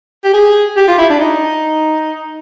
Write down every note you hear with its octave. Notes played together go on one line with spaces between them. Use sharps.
G4
G#4
G4
F4
E4
D4
D#4